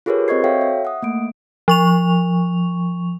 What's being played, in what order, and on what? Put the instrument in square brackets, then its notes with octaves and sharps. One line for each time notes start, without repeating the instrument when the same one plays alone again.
[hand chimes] F4 G4 G#4 A#4 B4 C#5
C4 C5 D#5 C#6 G#6 C7
F#4 A4 C#5 E5 F5 G5
E5
F#5 D#6
A3 A#3 D7
[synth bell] F3 C#6 F7